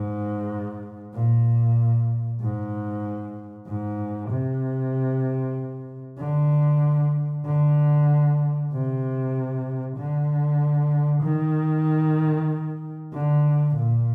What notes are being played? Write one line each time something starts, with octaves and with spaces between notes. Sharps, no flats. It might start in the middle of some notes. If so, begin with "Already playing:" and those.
Already playing: G#2
A#2
G#2
G#2
C3
D3
D3
C3
D3
D#3
D3
A#2